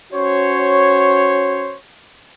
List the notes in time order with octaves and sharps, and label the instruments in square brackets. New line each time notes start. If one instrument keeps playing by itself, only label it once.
[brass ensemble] C#4 F#4 C5 C#5